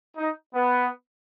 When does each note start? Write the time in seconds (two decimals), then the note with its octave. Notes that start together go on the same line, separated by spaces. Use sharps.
0.17 D#4
0.53 B3